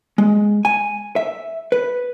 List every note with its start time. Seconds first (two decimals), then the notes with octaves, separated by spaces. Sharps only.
0.18 G#3
0.65 G#5
1.16 E5
1.72 B4